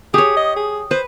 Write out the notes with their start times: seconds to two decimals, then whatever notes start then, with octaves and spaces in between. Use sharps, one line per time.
0.14 G4 G#4 C#5 D#6
0.37 D#5
0.56 G#4
0.91 B4 C5